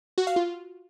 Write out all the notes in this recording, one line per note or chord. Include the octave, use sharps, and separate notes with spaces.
F#4
F5
F4